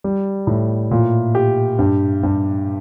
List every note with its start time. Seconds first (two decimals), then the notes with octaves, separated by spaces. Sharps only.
0.04 G3
0.47 A2
0.91 A#2
1.35 G4
1.79 G2
2.23 G2